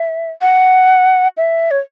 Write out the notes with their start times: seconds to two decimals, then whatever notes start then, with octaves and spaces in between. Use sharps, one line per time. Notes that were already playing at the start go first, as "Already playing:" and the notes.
Already playing: E5
0.42 F#5
1.37 E5
1.71 C#5